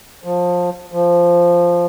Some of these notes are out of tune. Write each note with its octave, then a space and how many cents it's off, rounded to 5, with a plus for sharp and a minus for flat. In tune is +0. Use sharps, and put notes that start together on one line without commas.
F3 +20
F3 -5